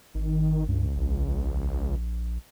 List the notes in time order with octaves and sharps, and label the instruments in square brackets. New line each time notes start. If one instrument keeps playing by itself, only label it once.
[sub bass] G#1 [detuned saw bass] D#3
[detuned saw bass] C#2 [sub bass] G2
[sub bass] A#1